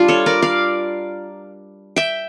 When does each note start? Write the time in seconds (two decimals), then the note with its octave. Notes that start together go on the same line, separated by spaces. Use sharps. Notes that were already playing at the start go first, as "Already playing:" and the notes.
Already playing: G3 D4 F4
0.08 A4 C#5
0.26 A#4 D5
0.42 D5 F5
1.96 E5 G5